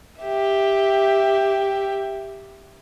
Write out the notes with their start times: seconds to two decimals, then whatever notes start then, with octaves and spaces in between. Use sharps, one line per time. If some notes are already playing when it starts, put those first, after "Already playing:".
0.21 G4 E5